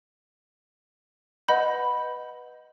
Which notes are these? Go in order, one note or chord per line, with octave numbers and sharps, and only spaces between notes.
B4 D#5 F#5 B5 G6